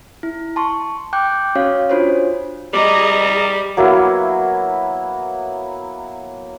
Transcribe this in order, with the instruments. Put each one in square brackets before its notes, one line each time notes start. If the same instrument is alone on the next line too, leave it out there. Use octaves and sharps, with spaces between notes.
[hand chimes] E4
A5 C6 C#6
G5 D6 F#6 G6
C#4 F#4 C#5 F5
D4 F4 F#4 C5 C#5
[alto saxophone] G3 [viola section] G#4 D#5 A#5 [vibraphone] D6
[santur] F#3 A#3 B3 E4